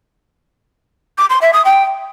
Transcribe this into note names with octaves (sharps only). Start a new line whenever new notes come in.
D6
C6
E5
D#6
G5